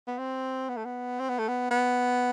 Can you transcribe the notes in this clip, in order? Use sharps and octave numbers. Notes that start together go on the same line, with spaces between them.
B3
C4
B3
A3
B3
C4
B3
A3
B3
B3